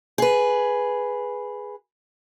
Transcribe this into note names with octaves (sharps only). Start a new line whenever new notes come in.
G#4 B4